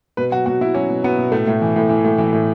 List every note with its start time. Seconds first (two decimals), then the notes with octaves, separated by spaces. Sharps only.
0.17 B2 B4
0.32 F#3 F#4
0.46 B2 F#4
0.61 B2 E4
0.74 F#3 C#4
0.90 B2
1.03 F#3 B3
1.19 B2
1.32 A2 A3
1.47 A2
1.62 E3
1.76 A2
1.89 E3
2.05 A2
2.18 E3
2.33 A2